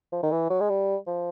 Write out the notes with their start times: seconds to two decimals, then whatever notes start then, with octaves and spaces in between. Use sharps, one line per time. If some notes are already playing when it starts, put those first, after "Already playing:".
0.12 F3
0.23 D#3
0.32 E3
0.50 F#3
0.60 G#3
0.70 G3
1.07 F3